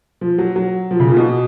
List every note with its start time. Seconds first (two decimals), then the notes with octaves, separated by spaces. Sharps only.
0.21 F3
0.38 F#3
0.56 F#3
0.91 F3
1.00 C#3
1.08 A#2
1.17 B2